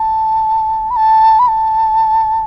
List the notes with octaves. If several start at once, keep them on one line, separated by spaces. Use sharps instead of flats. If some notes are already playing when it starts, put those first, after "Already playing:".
Already playing: A5
B5
A5
B5
A5